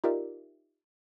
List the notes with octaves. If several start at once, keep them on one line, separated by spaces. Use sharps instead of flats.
D#4 F4 G4 A#4 D5 E5